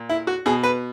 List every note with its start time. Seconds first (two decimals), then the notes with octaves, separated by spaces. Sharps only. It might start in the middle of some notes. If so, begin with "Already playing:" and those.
Already playing: A#2
0.09 E4
0.27 F#4
0.46 B2 G#4
0.63 B4